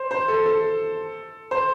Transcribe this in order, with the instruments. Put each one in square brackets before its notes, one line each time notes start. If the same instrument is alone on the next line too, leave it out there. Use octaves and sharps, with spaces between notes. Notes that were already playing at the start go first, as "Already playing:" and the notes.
Already playing: [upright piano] C5
C5
A4
A4
C5